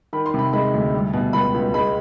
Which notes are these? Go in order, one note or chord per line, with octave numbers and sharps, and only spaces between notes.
D#3 B5
C6
C3 B5
G#3 B5
D2
G3
B2
C#2 B5
C#2
G#3 B5